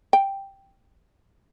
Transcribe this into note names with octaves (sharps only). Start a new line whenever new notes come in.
G5